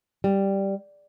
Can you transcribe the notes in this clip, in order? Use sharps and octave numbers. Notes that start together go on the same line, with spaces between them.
G3